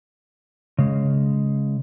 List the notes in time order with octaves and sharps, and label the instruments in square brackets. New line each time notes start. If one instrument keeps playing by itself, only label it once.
[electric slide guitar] C#3 G#3